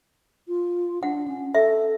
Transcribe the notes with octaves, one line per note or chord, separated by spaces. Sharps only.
F4
D4 F#5
C#4
A4 E5